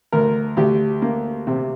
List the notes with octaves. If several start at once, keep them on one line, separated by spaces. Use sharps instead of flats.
D2 A#4
D2 G4
A#3
C3